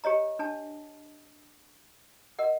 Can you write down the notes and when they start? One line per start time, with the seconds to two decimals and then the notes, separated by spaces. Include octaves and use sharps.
0.04 G4 C#5 D#5 A#5
0.39 D4 A5
2.39 A#4 D#5 F#5